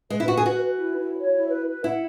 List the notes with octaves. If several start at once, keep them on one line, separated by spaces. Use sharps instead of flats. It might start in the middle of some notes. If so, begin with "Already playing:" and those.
G#3 B4
E4
F#4 B4
G#4
F#4 B4
B4
E4
E4
C#5
E4
B4
B4
E4 F#5